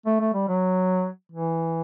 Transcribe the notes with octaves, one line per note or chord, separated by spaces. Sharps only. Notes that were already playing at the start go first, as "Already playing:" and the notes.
A3
A3
G3
F#3
E3